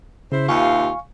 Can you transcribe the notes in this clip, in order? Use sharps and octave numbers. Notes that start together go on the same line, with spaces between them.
C#3 E4 C5
D#2 C3 F4 F5 G#5 C#6